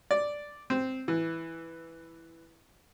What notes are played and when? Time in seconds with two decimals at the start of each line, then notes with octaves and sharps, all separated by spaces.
0.11 D5
0.70 C4
1.08 E3